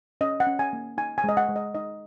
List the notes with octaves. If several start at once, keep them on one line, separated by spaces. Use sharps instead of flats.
C#4 D#5
F#5
C#4
G#5
A#3
D#4 G#5
G#5
G#3 D#5
F#5
G#3
D#5
D#4 D#5